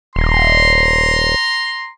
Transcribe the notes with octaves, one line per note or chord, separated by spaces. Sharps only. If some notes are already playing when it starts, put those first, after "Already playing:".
D#1 A#5 C6